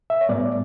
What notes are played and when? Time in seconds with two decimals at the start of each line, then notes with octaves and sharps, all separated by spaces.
0.10 E5
0.21 C#5
0.29 A2 G3 B3 D5